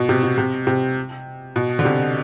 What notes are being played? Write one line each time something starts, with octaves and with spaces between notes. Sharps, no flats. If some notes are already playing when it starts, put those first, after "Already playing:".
Already playing: B2
C3
B2
C3
C3
B2
D3
C3